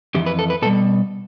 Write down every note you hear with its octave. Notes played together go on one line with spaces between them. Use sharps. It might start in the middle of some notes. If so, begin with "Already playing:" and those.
F2 E3 G4
B4
A4
B4
B2 G3 A4